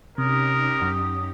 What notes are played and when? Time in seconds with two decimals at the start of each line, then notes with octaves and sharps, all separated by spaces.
0.18 C3 C#4 D#4 G4 A#4 D#6
0.81 F#2